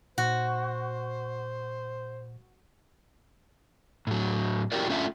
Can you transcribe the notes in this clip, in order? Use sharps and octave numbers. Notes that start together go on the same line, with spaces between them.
A#2 F#4 C5
A2 F#3
E4 F#4 G4 A#4 D5
A3 C#4 D4 F4 E5